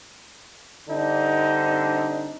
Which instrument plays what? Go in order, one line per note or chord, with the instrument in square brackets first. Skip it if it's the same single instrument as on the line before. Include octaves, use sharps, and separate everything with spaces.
[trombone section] G2 D3 C4 D4 D#4